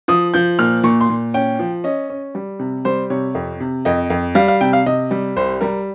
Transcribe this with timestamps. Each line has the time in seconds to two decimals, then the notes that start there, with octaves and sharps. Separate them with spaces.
0.08 F3 D#6
0.34 F3 G6
0.59 A#2 F6
0.84 A#2 C#6
1.01 C6
1.10 A#2
1.34 C#4 G5
1.59 F3
1.84 C#4 D#5
2.09 C#4
2.35 G3
2.59 C3
2.85 G3 C5
3.10 C3 C#5
3.35 F2
3.60 C3
3.85 F2 D#5
4.10 F2
4.35 G3 F5
4.48 F5
4.61 C3 G5
4.73 F5
4.86 C3 D#5
5.11 G3
5.36 C2 C5
5.61 G3 A#4